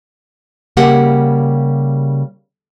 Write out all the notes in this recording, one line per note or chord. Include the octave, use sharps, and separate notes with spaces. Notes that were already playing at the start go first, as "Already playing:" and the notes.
C#3 G3 A#3 G4 F#5